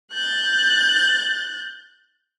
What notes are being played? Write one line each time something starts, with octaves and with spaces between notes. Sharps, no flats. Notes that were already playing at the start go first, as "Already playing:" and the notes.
F#6 G6 A6